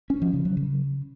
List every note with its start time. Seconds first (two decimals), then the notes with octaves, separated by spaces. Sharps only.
0.10 C#4
0.22 F3
0.33 C#3
0.45 F#3
0.57 C#3